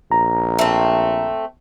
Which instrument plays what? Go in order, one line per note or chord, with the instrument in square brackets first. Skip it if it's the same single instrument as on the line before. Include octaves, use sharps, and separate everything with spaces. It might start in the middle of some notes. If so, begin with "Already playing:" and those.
[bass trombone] A#1 [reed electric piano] A#5
[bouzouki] A3 C4